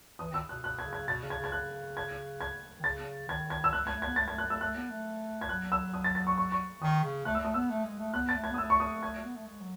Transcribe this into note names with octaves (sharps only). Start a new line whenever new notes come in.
E3 D#6
D#3 E6
B2 F#6
B2 F#6
G#6
C#3
G#6
B2 A6
C#3
G#6
C#3
G#6
C#3 F#6
G#6
G#6
D#3
C#3 A6
D#3 G#6
G#6
E6
G#3 F#6
A3
G#3 G#6
A3
B3 G#6
A3 A6
G#3
G#6
A3
F#6
A3 E6
A3 F#6
B3
A3
G#6
F#3 F#6
E6
D#6
A6
A6
C#6
C#6
C#6
D#3 D#6
C#3
A3 F#6
E6
A3 D#6
B3 E6
A3
G#3
A3
B3 F#6
A6
A3
G#6
B3
D#6
A3 E6
C#6
D#6
G#6
B3
A3
G#3
F#3